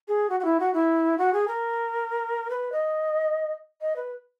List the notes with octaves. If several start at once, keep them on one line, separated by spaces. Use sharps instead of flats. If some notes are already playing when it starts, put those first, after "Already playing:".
G#4
F#4
F#4
E4
F#4
E4
F#4
G#4
A#4
B4
D#5
D#5
B4